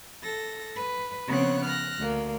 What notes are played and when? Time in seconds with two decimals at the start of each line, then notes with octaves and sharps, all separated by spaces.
0.23 A4 A#6
0.75 B4
1.27 C#3 F3 B3 C4 C#5 F#6
1.65 F6 F#6 A#6
1.97 D2 A#3